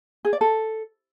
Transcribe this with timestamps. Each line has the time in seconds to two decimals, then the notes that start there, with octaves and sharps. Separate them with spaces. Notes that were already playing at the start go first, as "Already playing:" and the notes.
0.25 G#4
0.33 D5
0.41 A4